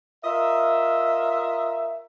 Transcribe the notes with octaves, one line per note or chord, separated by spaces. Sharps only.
F4 A#4 D#5 E5